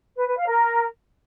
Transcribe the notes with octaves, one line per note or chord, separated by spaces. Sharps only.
B4
B4
F5
A#4